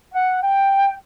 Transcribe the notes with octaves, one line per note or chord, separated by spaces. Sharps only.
F#5
G5